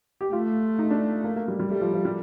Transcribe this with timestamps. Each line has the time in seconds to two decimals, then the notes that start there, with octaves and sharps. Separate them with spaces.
0.21 G4
0.33 A3 F4
0.79 D#4
0.90 D4
1.24 A#3
1.36 A#3
1.48 G3
1.60 G3
1.70 G3 A3
1.81 F3
1.94 F3
2.05 G3